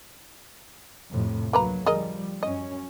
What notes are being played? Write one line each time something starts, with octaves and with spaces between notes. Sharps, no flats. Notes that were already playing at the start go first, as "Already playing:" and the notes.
F2 A2 C3
D2 F#3 A#3 B4 A#5
F3 G3 G#4 A#4 D#5
F#2 C#4 D#5